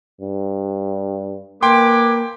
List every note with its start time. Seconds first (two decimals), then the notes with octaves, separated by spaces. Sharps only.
0.21 G2
1.63 A#3 B4 G5 G#5 C6 D6